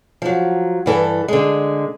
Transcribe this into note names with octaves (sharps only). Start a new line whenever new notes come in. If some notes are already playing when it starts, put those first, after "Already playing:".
F3 F#3
G2 E3 A4
D3 G#3